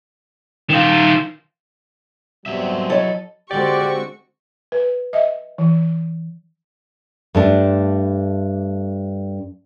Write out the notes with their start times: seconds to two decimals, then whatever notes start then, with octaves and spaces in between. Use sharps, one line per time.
0.70 D#3 F4
2.46 B2 F#3 G3 C4 E5
2.90 E4 A4 C#5 D#5
3.51 D3 G#3 C4 F#4 G4 D5 C#6
4.72 B4
5.13 D#5 E5
5.58 E3
7.35 G2 A3 D4